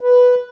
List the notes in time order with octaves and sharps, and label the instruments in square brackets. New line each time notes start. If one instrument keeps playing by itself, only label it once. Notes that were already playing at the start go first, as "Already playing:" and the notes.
[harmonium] B4